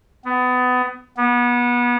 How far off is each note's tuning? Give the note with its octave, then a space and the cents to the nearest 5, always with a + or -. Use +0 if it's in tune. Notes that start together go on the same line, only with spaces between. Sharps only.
B3 +25
B3 -30